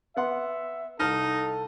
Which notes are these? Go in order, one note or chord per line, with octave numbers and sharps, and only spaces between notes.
B3 E5 F#5 C6
C2 D#4 A4 A5 F6